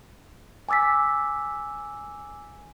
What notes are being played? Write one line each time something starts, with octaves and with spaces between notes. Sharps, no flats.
G#5 D6 E6 A6 B6